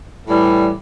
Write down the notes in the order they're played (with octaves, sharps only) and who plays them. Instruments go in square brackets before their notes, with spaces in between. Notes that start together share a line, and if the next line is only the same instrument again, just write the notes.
[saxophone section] A2 E3 G3